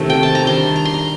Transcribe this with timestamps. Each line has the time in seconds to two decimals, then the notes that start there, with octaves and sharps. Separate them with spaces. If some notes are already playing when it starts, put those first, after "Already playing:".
Already playing: C3 D#3 A3
0.10 G5
0.23 A5
0.35 A#5
0.47 D#3 G3 D4 C6
0.76 A#5
0.85 C6
0.94 A#5